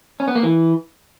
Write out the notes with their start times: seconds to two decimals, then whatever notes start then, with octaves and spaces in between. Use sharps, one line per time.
0.20 C#4
0.28 B3
0.35 A#3
0.43 E3